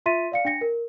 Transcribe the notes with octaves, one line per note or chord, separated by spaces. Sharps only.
F4 E5 C6 A6 B6 D#7
D5 F5 C#7
D4 G5 A#6 C#7
A#4